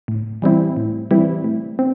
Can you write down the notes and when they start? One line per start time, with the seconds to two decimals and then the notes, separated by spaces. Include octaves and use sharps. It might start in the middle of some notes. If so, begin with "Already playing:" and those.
0.08 A2
0.42 E3 G3 C4 E4
0.77 A2
1.11 E3 G3 C4 E4
1.44 A2
1.79 C4